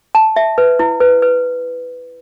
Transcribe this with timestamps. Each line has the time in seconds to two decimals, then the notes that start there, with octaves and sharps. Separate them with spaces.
0.15 A5
0.36 E5
0.58 B4
0.79 E4
1.00 B4
1.22 B4